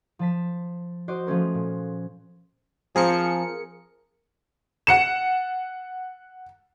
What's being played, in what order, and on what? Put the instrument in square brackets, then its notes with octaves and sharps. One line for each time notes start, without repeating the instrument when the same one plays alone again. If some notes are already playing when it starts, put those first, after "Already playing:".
[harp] F3 A5 B6
F#4 C5 D#5 D6
F3 A3 C#4 A#4
A#2
[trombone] F3 [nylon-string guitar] C4 [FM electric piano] G#4 A#4 C#7
[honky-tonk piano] F#5 C#7 E7